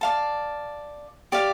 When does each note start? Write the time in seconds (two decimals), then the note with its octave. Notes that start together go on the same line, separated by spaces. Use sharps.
0.01 D5 F5 A5
1.32 G4 D5 F5